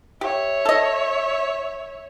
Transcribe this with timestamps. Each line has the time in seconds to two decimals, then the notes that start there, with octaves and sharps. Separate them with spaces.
0.21 G4 C#5 E5
0.65 A4 D#5